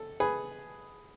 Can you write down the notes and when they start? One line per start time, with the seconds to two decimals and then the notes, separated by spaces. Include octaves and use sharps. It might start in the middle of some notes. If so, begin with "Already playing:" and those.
Already playing: A4
0.20 G#4 B4